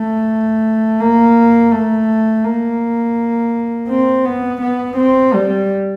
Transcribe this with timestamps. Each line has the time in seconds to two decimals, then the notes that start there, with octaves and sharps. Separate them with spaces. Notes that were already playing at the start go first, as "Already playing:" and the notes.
Already playing: A3
1.00 A#3
1.72 A3
2.44 A#3
3.89 C4
4.25 B3
4.61 B3
4.97 C4
5.34 G3